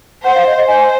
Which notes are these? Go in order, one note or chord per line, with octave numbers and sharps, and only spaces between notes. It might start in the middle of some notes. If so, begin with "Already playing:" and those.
C5 F#5
F5
D#5
D#5
C5 G#5